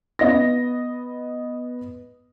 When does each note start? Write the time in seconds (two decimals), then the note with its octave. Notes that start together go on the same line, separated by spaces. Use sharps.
0.19 B3 D#5 A#6